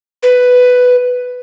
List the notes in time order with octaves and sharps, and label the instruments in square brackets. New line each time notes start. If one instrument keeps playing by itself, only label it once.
[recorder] B4